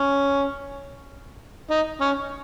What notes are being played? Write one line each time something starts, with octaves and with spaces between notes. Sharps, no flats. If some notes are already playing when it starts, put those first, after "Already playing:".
Already playing: C#4
D#4
C#4